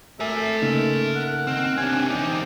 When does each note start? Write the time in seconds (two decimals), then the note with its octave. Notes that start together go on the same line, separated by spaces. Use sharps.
0.20 A3 A#4 E5 G#5
0.62 C#3 A#3 D#4
1.16 F#5
1.47 D#3 C4 F6
1.77 C3 C4 D4 G#5
2.10 E2 D#4 G4